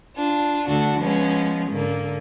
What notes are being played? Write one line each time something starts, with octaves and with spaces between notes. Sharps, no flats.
D4 F4
D2 D3 D4 F#4
F3 G#3 B3 C#4
G#2 D3 A#3